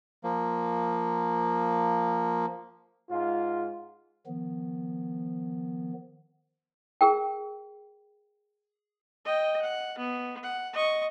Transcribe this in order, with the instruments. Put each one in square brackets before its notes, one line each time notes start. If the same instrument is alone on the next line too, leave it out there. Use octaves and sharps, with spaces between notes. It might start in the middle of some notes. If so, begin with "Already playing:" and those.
[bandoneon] F3 A#3
[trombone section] G#2 F4
[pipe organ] D#3 F3 B3
[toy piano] G#4 A#4 G5
[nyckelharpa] D#5 G5
F#5
B3
F#5
D#5 C#6